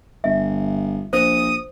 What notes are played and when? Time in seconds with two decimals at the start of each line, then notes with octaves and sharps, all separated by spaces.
0.24 G1 E5
1.13 A#1 C5 D#6